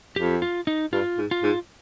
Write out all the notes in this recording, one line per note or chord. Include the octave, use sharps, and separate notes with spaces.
F2 G4
F4
D#4
G2 F4
G#2
F4
G#2